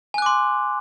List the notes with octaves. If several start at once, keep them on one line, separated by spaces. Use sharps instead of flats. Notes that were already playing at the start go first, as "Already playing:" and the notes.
G#5 C6 D6 F#6